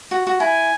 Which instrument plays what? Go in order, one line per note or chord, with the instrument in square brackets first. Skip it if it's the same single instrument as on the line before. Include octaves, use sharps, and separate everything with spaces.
[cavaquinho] F#4
F#4
[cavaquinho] E4 [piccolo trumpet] G#5